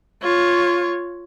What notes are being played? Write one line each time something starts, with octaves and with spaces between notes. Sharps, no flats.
F4 C#5